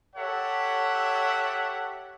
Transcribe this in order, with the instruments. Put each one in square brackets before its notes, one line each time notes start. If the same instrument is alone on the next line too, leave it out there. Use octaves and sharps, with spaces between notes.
[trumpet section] G4 A4 C#5 E5 F#5